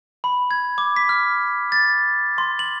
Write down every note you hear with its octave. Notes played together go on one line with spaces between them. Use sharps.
B5
G#6
D6
B6
F6
A6
C6
F#7